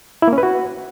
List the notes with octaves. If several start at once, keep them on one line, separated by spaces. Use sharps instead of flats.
E4
A#3
C#4
B4
F#4